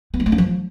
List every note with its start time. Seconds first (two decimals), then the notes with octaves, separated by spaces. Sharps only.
0.14 B3
0.20 G#3
0.26 A3
0.32 C#4
0.38 F3